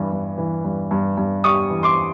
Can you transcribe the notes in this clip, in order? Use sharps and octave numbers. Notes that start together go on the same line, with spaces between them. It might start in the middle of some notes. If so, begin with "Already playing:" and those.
Already playing: G2 E3 G3
G2
E3
G2
G2
G2
G3 C#6 D#6
E3
C6 D6